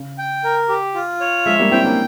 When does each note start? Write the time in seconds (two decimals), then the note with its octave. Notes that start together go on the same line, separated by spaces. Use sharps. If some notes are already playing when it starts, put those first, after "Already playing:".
Already playing: C#3
0.18 G5
0.44 A#4
0.69 G4
0.95 F4
1.21 C#5
1.46 F3 G#3 E5
1.59 G3 A#3
1.72 C4 E4 G5
1.85 A#3 C#4